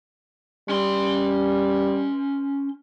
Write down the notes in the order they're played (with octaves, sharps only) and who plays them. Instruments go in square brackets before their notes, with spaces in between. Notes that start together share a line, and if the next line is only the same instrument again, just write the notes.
[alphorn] G3 [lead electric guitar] C#4 C6